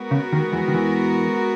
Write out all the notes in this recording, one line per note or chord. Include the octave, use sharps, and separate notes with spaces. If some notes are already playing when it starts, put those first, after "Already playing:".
Already playing: G#3 B3 F#4 A#4
C#3
D#2 D#3
E2 E3
D#3
E2 E3